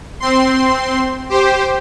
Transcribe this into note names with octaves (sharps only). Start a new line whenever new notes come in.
C4 C6
G4 C5